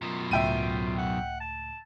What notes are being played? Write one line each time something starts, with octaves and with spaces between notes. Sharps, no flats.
F#2 B2 F4
C#2 A2 E5 G5 D#7
F#5
A5